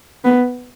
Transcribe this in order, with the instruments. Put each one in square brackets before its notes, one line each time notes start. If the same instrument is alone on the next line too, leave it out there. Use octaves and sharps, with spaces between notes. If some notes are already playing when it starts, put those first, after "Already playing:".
[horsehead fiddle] B3